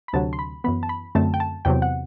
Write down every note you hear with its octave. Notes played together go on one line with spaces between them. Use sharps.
B5
D2 C3 F#3 A5
C6
B5
F#2 E3 B3 B5
A5
B5
F#2 D3 A3 C4 A5
G5
A5
E2 C3 F#3 G5
F#5